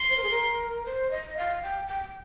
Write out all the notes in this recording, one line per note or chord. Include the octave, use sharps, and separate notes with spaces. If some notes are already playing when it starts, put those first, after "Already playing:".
Already playing: C6
C5
A#4
G#4
A#4
C5
D#5
F5
G5
G5